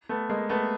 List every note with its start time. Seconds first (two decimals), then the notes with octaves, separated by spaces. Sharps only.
0.09 A3 B3
0.29 G#3 A#3
0.49 A3 B3